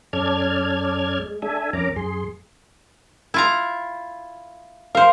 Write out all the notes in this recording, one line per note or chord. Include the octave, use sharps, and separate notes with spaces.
F#2 C#4 A4 D5 F6 G#6
G#3
D4 A4 E5 G#5
F2 C#4 A#4 A#5 D6
F#2 G#4 C6
E4 F4 A#5
A#4 C5 F5